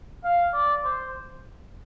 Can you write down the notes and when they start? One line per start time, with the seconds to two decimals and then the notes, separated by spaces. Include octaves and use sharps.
0.24 F5
0.53 D5
0.84 C5